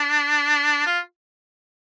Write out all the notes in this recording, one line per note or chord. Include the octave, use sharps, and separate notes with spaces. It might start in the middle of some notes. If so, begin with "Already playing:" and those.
Already playing: D4
F4